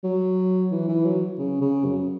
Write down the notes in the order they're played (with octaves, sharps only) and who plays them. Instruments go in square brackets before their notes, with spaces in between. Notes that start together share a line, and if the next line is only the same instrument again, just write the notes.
[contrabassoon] F#3
E3
E3
F#3
C#3
C#3
F#2